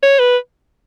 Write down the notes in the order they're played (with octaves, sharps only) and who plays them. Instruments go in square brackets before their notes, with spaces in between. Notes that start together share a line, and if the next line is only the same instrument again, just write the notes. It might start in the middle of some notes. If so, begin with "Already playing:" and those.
[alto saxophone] C#5
B4